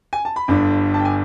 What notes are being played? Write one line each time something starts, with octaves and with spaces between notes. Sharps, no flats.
G#5
A5
B5
G1 G2 D3
A5
G5
G#5